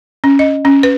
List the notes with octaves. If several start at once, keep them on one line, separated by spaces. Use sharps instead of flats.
C#4
D#5
C#4
B4